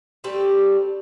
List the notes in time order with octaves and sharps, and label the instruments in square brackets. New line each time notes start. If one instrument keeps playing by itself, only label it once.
[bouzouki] G3 A3 C4 G4